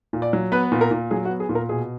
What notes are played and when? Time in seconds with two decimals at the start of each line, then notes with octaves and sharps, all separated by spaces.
0.13 A#2
0.22 D5
0.33 F#3
0.52 B3 B4
0.72 A#2
0.81 A#4
0.91 A#2
1.11 F#3 G#4
1.25 F#4
1.30 B3
1.40 G#4
1.49 A#2
1.55 A#4
1.69 B2 G#4